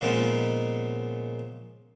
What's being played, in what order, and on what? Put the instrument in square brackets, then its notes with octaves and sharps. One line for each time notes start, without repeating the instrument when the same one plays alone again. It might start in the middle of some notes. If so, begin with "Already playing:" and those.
[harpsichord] A#2 C#3 F3 G#3 B3 D#4